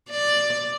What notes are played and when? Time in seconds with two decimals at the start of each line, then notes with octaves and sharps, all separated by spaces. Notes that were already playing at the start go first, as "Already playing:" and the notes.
0.10 D5